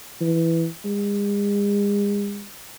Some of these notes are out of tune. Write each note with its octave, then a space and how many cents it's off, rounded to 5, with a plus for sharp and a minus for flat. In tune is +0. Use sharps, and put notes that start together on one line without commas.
E3 +0
G#3 -40